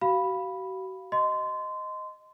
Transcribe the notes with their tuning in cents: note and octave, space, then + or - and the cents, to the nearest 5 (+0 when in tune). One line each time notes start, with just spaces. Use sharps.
F#4 +40 F5 +0 B5 +0
D#5 +0 C6 -20